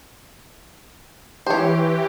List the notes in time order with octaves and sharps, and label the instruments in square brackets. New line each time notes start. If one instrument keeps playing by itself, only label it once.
[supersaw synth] E3 G4 [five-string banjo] C5 C#5